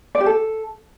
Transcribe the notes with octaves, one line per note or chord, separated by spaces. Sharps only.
D5
G4
A4